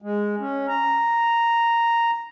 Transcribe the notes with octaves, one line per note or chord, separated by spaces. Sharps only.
G#3
C#4
A#5